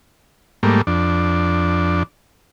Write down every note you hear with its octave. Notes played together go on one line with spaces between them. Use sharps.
G#2 G3 A3 A#3
F2 D4